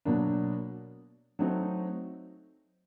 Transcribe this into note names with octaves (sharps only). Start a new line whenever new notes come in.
B2 F#3 A#3 D4
F#3 A3 C4 D#4